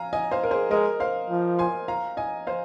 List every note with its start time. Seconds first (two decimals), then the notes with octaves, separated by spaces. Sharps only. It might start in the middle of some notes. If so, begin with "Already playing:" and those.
Already playing: F5 G#5 A#5
0.13 D#5 G#5
0.31 C5 F5
0.43 A#4
0.51 G#4 C5
0.71 G#3 A#4 D#5
1.00 C5 F5
1.30 F3
1.59 G#5 C6
1.88 F5 A#5
2.17 D#5 G#5
2.47 C5 F5